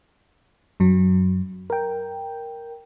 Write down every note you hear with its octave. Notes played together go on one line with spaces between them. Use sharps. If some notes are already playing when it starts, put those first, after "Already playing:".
F#2 F#3
A#4 G5